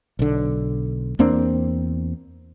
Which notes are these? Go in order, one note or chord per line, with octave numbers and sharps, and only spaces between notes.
B1 D3
E2 A#3 C4 D4